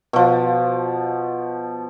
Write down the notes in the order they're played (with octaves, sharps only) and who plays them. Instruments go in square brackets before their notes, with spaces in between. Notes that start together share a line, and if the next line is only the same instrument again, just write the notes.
[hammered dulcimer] B2 F3